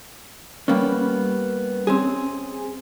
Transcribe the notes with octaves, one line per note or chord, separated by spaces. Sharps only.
G3 A#3 B3 C#4
C4 C#4 G#4